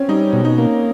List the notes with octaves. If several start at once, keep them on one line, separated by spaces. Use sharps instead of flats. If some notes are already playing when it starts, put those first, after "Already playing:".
Already playing: C4 C#4
G3 D#4
B2
D#4
A#3